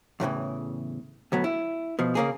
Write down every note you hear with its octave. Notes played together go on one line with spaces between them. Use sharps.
E2 A2 C#3 E3
D2 F#3 B3
E4
B2 F3
C#3 A#3 G#4